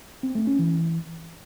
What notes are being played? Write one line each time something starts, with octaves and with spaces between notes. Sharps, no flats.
C4
A3
C#4
E3